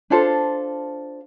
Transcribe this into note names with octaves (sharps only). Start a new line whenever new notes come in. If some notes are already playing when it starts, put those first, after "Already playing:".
D4 F4 A4 C5